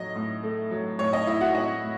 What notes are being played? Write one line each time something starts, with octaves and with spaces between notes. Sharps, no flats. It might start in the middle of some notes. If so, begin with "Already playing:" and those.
Already playing: A2 F#3 D#5
A2
A3
F#3
A2 C#5
D#5
A2 E4 E5
F#4 F#5
A2 D#5
A2